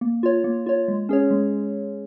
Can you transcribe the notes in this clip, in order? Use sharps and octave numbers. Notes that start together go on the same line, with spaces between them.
A#3
F4 C#5
A#3
F4 C#5
G#3
C#4 G#4 C#5
G#3